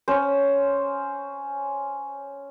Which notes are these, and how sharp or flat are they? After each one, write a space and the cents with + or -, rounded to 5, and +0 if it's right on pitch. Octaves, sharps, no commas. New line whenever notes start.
C#4 +5 C5 +0